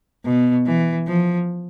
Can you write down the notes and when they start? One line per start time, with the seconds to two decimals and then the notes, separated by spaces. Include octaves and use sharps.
0.24 B2
0.65 E3
1.07 F3